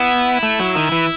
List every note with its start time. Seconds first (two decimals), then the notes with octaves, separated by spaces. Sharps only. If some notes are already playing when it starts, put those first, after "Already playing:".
Already playing: B3 E4
0.43 A3
0.60 F#3
0.76 D#3
0.92 E3